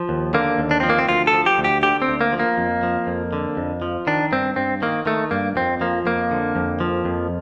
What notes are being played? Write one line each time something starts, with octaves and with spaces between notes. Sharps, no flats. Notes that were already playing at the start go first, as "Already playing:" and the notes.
Already playing: F3
D#2
D3 A#3
D#2
D4
F3 C4
A#3
C4
D2 F4
A4
F3
G4
D2
G4
D3 G4
C4
D2
A#3
F3
A#3
F2
F3
F2
D3
F2
F3
D#3 D4
G2 C4
G2 C4
D#3 A#3
D#3 A3
G2 A#3
F2 C4
F3 A#3
F2 A#3
D3
F2
F3
F2